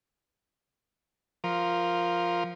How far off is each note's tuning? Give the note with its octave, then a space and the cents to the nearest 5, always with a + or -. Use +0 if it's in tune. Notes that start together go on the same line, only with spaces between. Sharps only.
F3 +0 A#4 +0